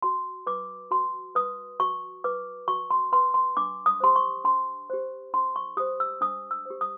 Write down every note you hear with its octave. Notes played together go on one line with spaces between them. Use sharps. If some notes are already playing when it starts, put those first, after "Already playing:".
F#4 C6
B4 D6
F#4 C6
B4 D#6
F#4 C#6
B4 D6
F#4 C#6
C6
B4 C6
C6
D4 D6
D#6
G4 C5 C6
C#6
D4 C6
G4 C5
D4 C6
C#6
G4 C5 D#6
E6
D4 D#6
E6
G4 C5
D#6